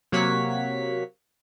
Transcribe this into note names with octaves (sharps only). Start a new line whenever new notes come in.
C3 F#3 A#3 C#5 F#5 B6